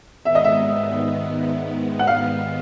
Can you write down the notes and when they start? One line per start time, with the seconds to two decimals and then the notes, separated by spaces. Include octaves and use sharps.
0.25 G#2 D#3 G#3 B3 E5
0.35 D#5
0.44 E5
1.99 F#5
2.07 F5